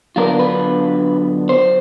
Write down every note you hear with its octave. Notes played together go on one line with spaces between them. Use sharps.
D3 F#3 B3 D4 F4 A#4
B4
C5